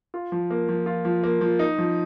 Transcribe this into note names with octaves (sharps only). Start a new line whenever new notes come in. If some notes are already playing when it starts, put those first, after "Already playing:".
F4
F3
A#3
F3
F4
F3
A#3
F3
D#4
F3